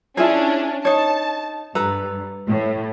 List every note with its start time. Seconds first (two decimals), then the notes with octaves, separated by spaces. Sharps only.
0.17 C#4 D4 E4 F4 G#4
0.85 D#4 C#5 A5
1.75 G2 A4 B4 A#5
2.48 A2